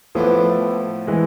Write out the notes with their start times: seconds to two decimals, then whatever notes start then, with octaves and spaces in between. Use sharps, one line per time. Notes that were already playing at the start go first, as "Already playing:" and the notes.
0.15 A2 E3 F3 A3 B3 D4
1.07 E3 G#3